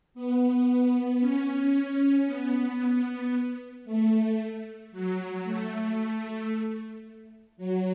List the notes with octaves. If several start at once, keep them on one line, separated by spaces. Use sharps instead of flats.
B3
C#4
B3
A3
F#3
A3
F#3